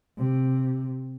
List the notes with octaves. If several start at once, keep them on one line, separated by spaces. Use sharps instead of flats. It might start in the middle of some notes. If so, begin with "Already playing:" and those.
C3